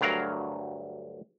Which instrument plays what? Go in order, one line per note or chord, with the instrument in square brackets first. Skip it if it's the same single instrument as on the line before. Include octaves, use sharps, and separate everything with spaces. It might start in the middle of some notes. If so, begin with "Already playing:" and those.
[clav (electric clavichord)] D2 G2 F#3 A#4 F5 A#5